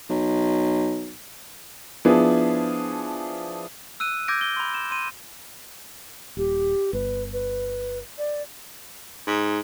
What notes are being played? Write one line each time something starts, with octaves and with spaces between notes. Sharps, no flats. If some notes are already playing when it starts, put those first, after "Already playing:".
B1
F3 B3 D4 E4 G#4
E6 F#6 D#7
D6 E6 G6 G#6 A#6 D7
G7
B5 C6
E7
C6 D#7
D#1 G4
G1 B4
B4
D5
G#2